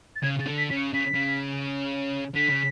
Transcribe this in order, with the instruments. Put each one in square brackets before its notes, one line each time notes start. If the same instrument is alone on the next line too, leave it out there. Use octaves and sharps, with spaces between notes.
[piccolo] A6
[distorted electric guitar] C#3 [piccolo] G#6
[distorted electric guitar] C#3 [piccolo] A6
[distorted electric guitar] D3
[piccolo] B6
[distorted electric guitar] C#3 [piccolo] B6
[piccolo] C#7
[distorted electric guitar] C#3 [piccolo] B6
[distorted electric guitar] C#3
[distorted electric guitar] D3 [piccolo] B6
[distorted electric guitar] C#3